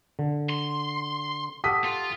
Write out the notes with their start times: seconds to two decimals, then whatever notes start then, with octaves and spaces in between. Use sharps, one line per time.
0.19 D3
0.49 C6
1.64 G4 A4 F#5 D#6 B6
1.85 F4